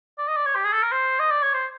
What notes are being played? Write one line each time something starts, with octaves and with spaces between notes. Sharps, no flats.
D5
D#5
D5
C#5
G4
G#4
A4
A#4
C5
D#5
D5
C#5
C5